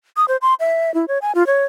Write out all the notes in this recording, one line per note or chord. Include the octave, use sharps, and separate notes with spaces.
D#6
C5
C6
E5
E4
C#5
G#5
F4
C#5